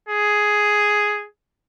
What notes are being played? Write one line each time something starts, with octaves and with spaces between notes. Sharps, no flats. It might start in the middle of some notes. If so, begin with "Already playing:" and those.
G#4